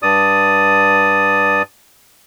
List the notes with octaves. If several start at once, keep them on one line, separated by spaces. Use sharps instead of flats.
G2 D5 D#6